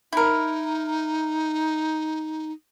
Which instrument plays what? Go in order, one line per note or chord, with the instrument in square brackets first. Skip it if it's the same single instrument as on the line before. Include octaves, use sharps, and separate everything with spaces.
[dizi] D#4 [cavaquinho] E4 A#4